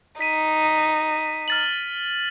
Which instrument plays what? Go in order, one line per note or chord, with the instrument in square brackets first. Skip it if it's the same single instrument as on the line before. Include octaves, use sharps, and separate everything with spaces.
[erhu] D#4 [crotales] B6 D#7
[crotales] F6 A6 F#7